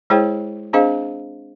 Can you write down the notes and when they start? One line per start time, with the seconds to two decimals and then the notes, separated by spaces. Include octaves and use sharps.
0.10 G#3 E4 G#4 C5 C#5 G5
0.73 C4 D4 G#4 C5 D#5 F5